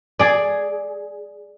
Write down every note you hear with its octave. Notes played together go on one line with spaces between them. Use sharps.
G#4 D5